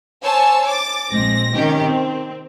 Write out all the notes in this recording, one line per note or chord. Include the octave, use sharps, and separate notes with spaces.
C5 C#5 G#5 A5 E6
D6 A6
A#1 G#3 C4 A#6
C3 D#3 C#4 G4
C4